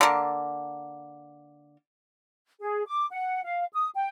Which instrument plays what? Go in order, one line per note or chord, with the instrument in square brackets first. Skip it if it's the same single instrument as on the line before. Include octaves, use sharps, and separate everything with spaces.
[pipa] D3 A#3
[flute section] G#4
D6
F#5
F5
D#6
G5